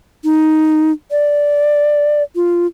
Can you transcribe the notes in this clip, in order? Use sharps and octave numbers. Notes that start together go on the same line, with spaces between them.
D#4
D5
F4